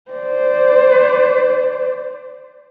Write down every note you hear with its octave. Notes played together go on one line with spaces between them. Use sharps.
C5 D5